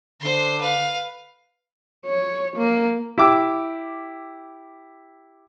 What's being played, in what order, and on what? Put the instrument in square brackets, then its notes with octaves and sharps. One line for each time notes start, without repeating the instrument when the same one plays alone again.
[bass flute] D3 [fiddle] C5 C6
[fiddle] B4 F5
[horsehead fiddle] C#5
A#3
[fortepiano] E4 G4 D6 E6